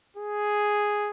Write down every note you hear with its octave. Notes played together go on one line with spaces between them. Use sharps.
G#4